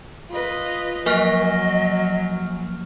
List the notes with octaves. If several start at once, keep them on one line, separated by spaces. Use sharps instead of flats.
F4 B4 D#5
F3 F#3 A#3 D#5 F6